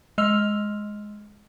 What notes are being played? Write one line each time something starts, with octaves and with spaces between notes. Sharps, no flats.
G#3 D#5 E6 F6 F7